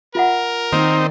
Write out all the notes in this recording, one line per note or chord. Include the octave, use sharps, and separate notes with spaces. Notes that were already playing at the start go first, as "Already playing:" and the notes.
F4 A#4 E5 F#5
D#3 A#3 C4 D#4 D5